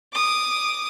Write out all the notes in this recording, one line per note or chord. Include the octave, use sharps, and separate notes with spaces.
D6 D#6